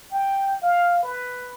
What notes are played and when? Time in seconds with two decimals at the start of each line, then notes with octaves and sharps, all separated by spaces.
0.11 G5
0.62 F5
1.03 B4